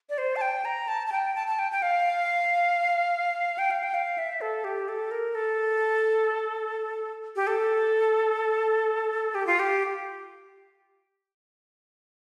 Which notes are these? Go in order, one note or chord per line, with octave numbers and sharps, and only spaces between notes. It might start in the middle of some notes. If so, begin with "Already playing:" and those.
D5
C5
A5
G5
A#5
A5
A5
G5
A5
A5
G5
G5
F5
G5
F5
G5
F5
E5
A4
G4
A4
A#4
A4
G4
A4
G4
F4
G4